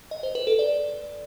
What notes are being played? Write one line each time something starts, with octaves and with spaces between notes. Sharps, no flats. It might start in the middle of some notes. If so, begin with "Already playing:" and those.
D#5
C5
B4
A4
D5